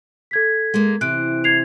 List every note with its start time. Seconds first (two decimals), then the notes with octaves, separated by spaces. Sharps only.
0.31 A4 G#6 B6
0.74 G#3 A#3
1.01 C3 E3 F#6 D7
1.44 G#6 C7 F7